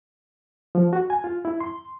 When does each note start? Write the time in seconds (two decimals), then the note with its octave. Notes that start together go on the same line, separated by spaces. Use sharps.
0.75 F3
0.93 F#4
1.10 G#5
1.24 F4
1.45 E4
1.60 C6